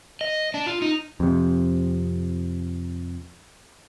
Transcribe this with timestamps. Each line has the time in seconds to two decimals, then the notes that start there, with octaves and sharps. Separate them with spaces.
0.21 D#5
0.54 D4
0.66 F4
0.82 D#4
1.20 F2 C3